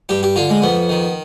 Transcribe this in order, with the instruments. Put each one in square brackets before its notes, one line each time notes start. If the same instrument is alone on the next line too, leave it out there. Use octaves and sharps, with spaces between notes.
[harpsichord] G2 G4
G4
D3 F4
G#3
F2 B3
D#3